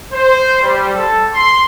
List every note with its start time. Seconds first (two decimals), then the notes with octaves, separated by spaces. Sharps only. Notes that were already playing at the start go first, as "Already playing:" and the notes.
0.13 C5
0.62 G3
0.94 A4
1.34 C6